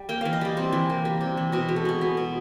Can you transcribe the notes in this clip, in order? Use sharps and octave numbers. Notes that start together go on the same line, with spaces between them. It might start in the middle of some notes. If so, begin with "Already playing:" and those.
Already playing: G3
A#3 G5
E3 F5
D#5
G3 D5
C3 C5
E3
A#3
G3
C3
E3
B2 F#4
G#3
A4
B2 G#4
B3
B2